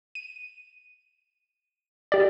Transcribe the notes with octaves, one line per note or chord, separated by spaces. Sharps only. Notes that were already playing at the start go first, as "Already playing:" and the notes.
D#7
G4 D5